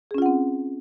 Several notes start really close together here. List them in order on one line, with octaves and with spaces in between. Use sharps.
G#4 C#4 F4 F#5 C4